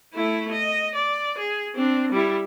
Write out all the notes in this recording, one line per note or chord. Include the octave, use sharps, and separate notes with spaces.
A3 E4
D#5
D5
G#4
C4 D4
G3 E4